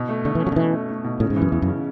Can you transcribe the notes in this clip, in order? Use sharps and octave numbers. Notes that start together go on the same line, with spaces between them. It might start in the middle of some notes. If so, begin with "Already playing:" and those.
Already playing: B2
A3
D3 A3
E3
C#4
F#3
D3
B2 E3
A3
A3
B2
A2 C#3
G#2
E3
F#2
E2 E3
F#2
C#3